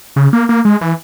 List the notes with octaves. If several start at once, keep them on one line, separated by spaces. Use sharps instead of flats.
C#3
A#3
A#3
G#3
E3